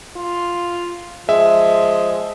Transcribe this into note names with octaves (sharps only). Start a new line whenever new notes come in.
F4
F3 G#3 E5